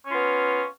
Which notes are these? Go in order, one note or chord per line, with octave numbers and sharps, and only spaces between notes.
B3 C#4 F4